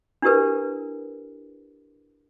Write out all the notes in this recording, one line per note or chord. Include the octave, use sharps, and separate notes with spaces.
D4 E4 G4 A#4 B4